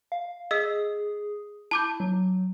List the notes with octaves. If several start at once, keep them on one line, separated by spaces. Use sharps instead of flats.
F5
G#4 D#5 E6 B6
E4 A5 D6 G6
F#3